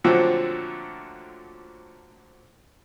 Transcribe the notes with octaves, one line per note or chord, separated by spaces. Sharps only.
A#2 D3 F3 F#3 A3 C4